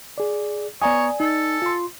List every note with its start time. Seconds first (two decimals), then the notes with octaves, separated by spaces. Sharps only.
0.18 G#4 D5
0.82 B3 C#5 D5 G#5 A#5 D#6
1.20 D#4 A4
1.62 F4 C6